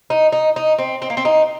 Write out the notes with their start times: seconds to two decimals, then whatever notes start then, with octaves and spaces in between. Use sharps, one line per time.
0.10 D#4
0.32 D#4
0.56 D#4
0.78 C4
1.02 C4
1.10 A#3
1.17 C4
1.25 D#4